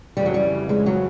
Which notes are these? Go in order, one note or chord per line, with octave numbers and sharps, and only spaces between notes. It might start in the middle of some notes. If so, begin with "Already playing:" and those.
F2 C#3 E3 G3
F#3
G3
G#3
F#3